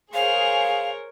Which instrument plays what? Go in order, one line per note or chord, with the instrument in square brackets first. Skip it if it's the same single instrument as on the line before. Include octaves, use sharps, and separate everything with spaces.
[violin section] G#4 [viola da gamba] A#4 C#5 [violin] C5 F7 [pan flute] F5